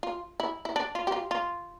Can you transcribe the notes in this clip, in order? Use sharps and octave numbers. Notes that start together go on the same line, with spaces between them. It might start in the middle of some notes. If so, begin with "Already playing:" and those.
F4
E4
E4
D4
F4
G4
F4
F4